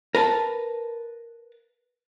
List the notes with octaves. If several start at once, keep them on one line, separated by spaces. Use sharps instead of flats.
A#4 B4 A5